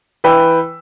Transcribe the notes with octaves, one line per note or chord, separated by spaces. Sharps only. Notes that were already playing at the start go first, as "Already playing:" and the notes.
E3 B4 G5 E6